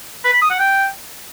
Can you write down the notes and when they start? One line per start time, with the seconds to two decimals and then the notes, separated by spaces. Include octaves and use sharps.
0.25 B4
0.33 B5
0.42 D#6
0.50 F#5
0.59 G5